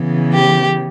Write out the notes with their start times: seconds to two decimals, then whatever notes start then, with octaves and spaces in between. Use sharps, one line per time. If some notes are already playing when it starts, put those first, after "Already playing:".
Already playing: C#3 E3 B3
0.33 G4